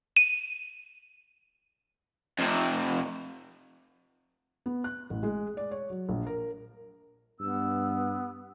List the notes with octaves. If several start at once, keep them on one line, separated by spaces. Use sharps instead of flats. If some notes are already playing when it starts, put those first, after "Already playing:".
D#7
F2 C3
B3
F#6
A1
G#3
D5
C#5
F#3
A#1
A#4
G2 B3 E6